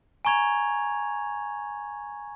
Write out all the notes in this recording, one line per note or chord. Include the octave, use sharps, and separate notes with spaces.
G#5 A#5 C#6 G#6 F7